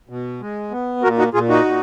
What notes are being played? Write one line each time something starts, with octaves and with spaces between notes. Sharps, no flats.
B2
G#3
B3
A#2 F#4 A#4
D#4 F#4
A#2 F4 G#4
D#4 F#4
A#2